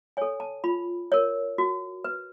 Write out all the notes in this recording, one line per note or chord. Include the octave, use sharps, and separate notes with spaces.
A4 C#5 G#5
A5
F4 B5
A#4 C#5
F#4
B4